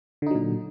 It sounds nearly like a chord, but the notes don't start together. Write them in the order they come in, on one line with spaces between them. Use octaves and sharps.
D3 D#4 F#3 A#2